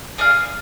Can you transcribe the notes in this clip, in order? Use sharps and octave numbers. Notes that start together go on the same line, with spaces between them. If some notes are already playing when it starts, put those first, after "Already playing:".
G#4 D5 F5